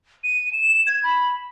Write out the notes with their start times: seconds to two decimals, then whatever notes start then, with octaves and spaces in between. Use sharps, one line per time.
0.24 D#7
0.53 E7
0.87 G#6
1.03 B5